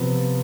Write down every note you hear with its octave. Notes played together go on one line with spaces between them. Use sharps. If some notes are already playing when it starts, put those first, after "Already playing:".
Already playing: C3 F3 B3